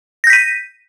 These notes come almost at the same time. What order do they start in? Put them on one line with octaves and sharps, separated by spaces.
A#6 G6 B6 D#7